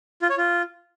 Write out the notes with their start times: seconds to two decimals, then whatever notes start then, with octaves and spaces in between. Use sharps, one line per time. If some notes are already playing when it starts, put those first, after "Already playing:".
0.22 F4
0.30 C#5
0.38 F4